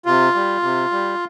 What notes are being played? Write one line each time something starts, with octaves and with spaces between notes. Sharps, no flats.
C3 F4
G3
C3
G3